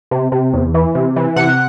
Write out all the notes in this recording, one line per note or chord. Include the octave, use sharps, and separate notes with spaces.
C3
C3
E2
E3
C3
E3
C3 F#5